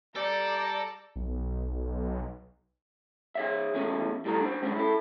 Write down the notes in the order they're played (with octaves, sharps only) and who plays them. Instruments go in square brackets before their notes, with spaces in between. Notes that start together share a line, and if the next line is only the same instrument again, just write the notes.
[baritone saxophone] G3 [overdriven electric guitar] A4 [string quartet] D5 [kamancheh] A#5
[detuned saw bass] B1
[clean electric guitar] G#4 C#5 E5
E2 G#2 G#3 A3 C#4
A2 G3 A4 A#5
D4 C5
G#3 C#4 D4 G#4 C#5
E4 A4